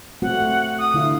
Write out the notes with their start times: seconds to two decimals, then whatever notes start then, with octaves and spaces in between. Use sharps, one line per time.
0.22 A3 C4 F#4 F#5
0.79 D#6
0.94 D3 E4 F5